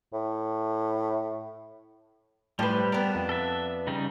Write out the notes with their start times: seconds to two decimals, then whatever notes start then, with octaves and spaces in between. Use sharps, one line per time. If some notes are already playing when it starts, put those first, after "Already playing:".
0.13 A2
2.59 A2 F3 G3 G4 B4 C5
2.92 B3 D4 A#4
3.15 F2
3.29 A4 E5
3.87 C#3 G3 D#4